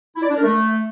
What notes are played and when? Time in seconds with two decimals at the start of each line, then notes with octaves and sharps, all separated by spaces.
0.16 E4
0.23 D5
0.29 D4
0.36 A#4
0.43 A3